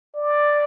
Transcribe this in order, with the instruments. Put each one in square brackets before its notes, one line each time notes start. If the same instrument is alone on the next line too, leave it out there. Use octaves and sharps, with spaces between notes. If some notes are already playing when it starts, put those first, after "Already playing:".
[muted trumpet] D5